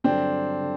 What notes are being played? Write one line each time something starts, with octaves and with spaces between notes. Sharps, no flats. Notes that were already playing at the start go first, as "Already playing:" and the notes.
G2 D3 F#3 C4 D4
D3